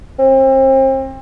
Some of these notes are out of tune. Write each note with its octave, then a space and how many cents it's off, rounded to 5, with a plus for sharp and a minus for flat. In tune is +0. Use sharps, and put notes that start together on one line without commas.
C4 +35